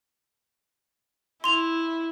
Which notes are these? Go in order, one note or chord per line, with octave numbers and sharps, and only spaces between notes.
E4 C6 F7